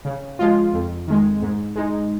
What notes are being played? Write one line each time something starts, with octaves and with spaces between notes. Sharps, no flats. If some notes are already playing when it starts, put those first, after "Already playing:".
C#3
F3 G#3 F4
F2
D#3 G#3
G#2
G#3 D#4